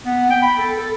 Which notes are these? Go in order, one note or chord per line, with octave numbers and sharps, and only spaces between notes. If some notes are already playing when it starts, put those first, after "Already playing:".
B3
G5
B5
A4
A4